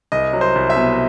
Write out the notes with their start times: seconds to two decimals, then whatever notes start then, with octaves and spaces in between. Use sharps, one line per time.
0.12 C2 D#5
0.33 F#3
0.41 C5
0.55 C2
0.70 E5
0.76 B2